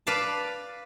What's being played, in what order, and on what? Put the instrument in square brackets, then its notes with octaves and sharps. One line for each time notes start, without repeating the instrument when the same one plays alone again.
[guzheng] B4 D5 F5 A5